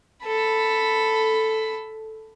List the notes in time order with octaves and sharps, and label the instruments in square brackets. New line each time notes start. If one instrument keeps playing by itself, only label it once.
[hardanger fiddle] A4 B5